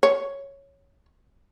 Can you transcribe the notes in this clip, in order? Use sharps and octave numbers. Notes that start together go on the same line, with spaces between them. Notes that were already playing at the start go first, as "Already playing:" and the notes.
C#5